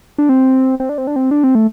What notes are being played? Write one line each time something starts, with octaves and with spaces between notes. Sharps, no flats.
D4
C4
C4
D4
C4
D4
C4
D4
C4
A3